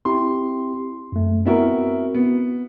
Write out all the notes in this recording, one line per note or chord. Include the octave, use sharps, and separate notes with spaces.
C4 E4 G4 C6
F#2 A3
B3 C4 E4 F#4 A#4
B3